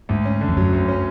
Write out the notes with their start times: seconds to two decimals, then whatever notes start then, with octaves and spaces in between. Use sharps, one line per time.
0.09 D2 G#2
0.25 C#4
0.41 D3
0.48 F2
0.57 F#2 F#3
0.73 D2
0.88 C#4